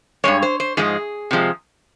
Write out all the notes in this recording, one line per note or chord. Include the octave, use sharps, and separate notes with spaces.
G2 D#3 G#3 C#5
C5
C5
G#2 F3 G#3 G#4
C3 F3 G#3